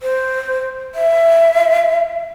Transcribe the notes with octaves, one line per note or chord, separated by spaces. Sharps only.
C5
E5